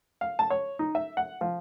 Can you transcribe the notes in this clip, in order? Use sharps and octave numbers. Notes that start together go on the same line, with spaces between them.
F5
A5
C#5
D#4
E5
F#5
F3